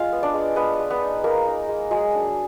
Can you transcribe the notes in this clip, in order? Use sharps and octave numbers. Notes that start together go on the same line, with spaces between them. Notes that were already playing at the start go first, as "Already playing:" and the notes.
Already playing: G#3 F4 F5
B3
D4 D5
G#3
G#3 B3 B4
G#3
B3 B4
D#4
G#3 A#3 A#4
D#4
G#3
F#3 G#3 G#4
D4